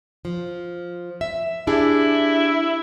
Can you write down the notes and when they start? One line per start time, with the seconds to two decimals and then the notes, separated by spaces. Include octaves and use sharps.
0.25 F3
1.21 E5
1.67 D4 E4 G4 G#4